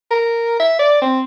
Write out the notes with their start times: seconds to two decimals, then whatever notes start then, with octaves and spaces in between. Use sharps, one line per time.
0.11 A#4
0.60 E5
0.79 D5
1.02 C4